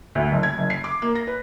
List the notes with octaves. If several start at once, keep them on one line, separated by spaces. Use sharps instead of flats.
D2
F#1
G#6
F#1
C7
D6
A#3
A#6
B4